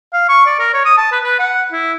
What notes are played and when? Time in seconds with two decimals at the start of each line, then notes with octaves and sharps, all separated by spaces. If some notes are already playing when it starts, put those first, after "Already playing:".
0.13 F5
0.29 C#6
0.46 D5
0.59 A#4
0.74 C#5
0.85 D#6
0.98 A5
1.12 B4
1.23 B4
1.39 F#5
1.72 E4